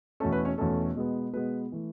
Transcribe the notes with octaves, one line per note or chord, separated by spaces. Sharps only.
E2 B2 A3 C#4 A4
B4
C#4 C#5
E2 B2 A3 C#4 A4
B2 G#3 B3
B2 G#3 B3 B4
E3 A3